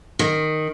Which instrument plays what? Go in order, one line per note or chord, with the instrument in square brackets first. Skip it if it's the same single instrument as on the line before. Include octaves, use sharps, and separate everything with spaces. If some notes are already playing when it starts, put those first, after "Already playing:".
[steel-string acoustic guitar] D#3